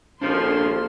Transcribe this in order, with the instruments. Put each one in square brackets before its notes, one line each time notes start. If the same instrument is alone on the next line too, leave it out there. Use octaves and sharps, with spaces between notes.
[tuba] A#1 [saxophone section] D#2 F3 [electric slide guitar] D4 F#4 G4 [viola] A4 C6